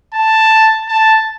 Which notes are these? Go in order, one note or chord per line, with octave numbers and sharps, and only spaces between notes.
A5
A5